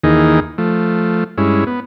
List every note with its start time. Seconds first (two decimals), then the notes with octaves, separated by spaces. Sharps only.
0.04 D#2 D#3 E3 A#3 D#4 G#4
0.58 F3 A3
1.37 G2 G#3 C#4 E4
1.67 B3